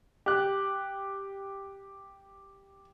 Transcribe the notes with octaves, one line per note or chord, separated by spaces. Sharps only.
G4 F#6